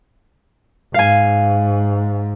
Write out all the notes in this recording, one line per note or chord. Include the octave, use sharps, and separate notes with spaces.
G#2 F5 G#5